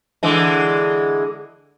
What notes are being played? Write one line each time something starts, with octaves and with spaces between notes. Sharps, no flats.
D3 E3 G#3